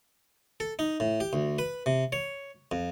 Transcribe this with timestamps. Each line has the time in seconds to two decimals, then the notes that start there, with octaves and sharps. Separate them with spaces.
0.60 A4
0.79 D#4
1.00 A2
1.20 G4
1.33 D2
1.59 B4
1.86 C3
2.12 C#5
2.72 F2